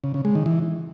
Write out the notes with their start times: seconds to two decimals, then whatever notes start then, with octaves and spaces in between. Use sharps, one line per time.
0.04 C#3
0.14 C#3
0.25 G#3
0.35 D#3
0.46 E3